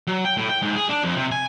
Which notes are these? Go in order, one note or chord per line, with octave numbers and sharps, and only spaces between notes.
F#3
G5
A2
G5
G#2
G#4
D4
F2
C3
G#5